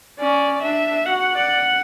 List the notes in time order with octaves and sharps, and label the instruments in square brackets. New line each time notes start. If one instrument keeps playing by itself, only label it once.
[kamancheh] C#4 [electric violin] D5
[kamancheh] D4 [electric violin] E5
[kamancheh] F#4 [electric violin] F#5
[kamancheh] D5